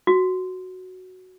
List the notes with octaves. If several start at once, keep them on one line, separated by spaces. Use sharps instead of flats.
F#4